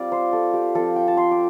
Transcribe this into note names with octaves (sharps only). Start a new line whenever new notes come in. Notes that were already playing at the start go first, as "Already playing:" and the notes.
Already playing: G3 C4 F4 D5
C5
A4
G4
F3 C4 F4 A4
G5
A5
C6
D6